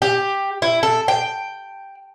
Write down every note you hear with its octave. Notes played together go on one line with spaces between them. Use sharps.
G4
E4
A4
G5